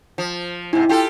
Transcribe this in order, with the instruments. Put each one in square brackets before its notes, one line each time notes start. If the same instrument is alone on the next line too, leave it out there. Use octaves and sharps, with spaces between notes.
[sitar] F3
[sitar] G#2 C3 [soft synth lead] E4
[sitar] F4 G4 A4